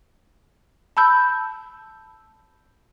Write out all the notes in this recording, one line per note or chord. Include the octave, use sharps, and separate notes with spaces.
A5 B5 E6 G6